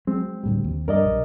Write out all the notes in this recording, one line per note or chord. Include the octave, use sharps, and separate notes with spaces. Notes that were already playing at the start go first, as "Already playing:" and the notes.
F#3 G#3 C4
D2 A2 G3
D#2
G2 A#4 D5 D#5
B1